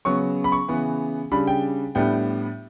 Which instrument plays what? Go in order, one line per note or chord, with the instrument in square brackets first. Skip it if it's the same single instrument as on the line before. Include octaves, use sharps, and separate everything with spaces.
[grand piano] C#3 F#3 B3 C#6
B5
C#6
C#3 E3 B3
C#3 G3 D4 B5
G5
A2 G3 B3 D4 G5